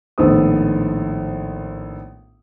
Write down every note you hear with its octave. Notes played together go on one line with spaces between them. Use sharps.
A#1 A2 D#3 B3 A4 D#6